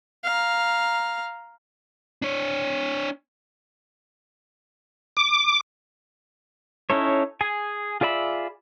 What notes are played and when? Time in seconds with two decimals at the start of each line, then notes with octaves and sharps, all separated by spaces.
0.24 F5 A#5
2.22 D4 C#5
5.17 D6
6.90 C#4 D#4 E4 A4 C#5
7.41 G#4 G#5
8.01 F4 G#4 D5 E5 B5